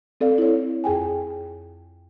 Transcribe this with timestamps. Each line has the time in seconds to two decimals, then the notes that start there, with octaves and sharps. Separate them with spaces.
0.21 C4 A4 D5 F5
0.38 E4 C#5
0.84 F2 G#4 G5 G#5